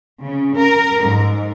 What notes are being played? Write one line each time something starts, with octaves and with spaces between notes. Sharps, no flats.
C#3
A#4
G#2